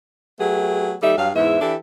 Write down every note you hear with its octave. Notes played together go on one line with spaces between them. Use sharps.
F#3 A3 B3 G4 G#4
D#2 G3 D#4 A4 E5
G2 F#3 F5
E2 G#2 E3 E4 E5
E3 D4 E4 G4 A4